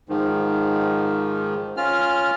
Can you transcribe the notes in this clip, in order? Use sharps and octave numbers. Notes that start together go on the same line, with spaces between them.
G#2 D#3 F3
C#4 F4 F6